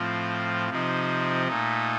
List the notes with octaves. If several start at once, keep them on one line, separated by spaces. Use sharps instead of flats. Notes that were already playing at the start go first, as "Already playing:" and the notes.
Already playing: A2 F3 C4 F4
C3 F3 C4 D#4
A#2 A3 D#4